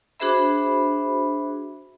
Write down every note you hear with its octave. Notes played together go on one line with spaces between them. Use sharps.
D4 F#4 G#4 C5 E5 B5